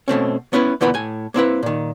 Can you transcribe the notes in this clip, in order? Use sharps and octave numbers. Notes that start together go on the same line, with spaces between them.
B2 A3 C4 C#4
B3 C#4 E4 B4 C#5
D2 A#2 E3 B3 B5
A2 G#5
A#3 C4 E4 B4
A#2 D#3